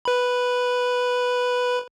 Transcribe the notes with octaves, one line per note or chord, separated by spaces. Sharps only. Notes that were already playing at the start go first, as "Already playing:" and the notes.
B4 B5